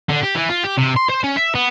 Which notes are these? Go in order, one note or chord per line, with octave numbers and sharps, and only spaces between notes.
D3
G4
E3
F4
G4
C3
C6
C5
C#4
E5
B3